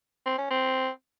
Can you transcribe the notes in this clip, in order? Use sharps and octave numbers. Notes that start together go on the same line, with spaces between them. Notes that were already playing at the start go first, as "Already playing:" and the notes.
C4
C#4
C4